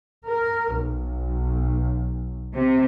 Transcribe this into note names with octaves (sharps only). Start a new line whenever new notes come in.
A#4
B1
C3